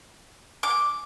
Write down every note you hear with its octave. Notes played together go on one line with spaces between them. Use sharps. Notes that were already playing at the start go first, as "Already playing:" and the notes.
D6